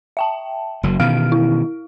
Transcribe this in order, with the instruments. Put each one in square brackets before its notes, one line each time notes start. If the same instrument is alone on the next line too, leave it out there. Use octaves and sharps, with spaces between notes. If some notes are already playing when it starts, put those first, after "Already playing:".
[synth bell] E5 G5 A5
[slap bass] F#1 F#3
[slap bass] B2 D#3 E3 [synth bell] F5 F6 D7
[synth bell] E4